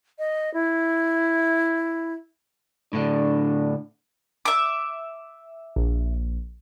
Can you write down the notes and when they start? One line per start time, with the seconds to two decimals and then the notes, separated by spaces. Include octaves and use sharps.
0.19 D#5
0.54 E4
2.93 A2 D3 D4
4.45 E5 D6
5.76 A#1